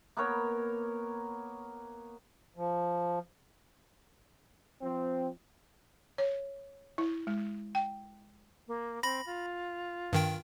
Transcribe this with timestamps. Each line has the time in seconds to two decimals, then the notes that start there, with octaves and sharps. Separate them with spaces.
0.17 A#3 B3 A#4 C#5
2.56 F3
4.82 F3 C4
6.18 C#5
6.98 E4
7.27 G#3
7.75 G5
8.68 A#3
9.03 C4 B5 A#6
9.26 F4
10.13 G2 D#3 G5